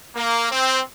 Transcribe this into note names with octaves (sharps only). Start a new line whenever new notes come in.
A#3
C4